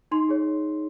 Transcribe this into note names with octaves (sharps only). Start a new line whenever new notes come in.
D#4 C6
G#4 C#5